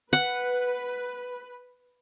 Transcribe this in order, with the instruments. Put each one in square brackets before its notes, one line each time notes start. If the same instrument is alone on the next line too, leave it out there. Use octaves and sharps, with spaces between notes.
[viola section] B4 [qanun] F#5